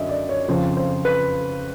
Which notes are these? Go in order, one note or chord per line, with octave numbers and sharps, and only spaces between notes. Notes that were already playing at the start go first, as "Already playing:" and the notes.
Already playing: F#2 D3 D#5 E5
D5
C#5
F2 C#3 F3 C5
C5
B4